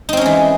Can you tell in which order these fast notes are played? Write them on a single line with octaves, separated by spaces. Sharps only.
D#4 C4 C#4 G#3 E3